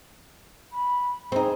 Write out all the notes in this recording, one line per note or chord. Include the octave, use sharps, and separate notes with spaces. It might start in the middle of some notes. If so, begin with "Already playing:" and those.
B5
C4 D#4 G#4